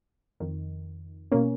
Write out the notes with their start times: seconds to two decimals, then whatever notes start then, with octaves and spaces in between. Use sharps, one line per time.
0.40 F2 D#3
1.32 B2 A#3 C#4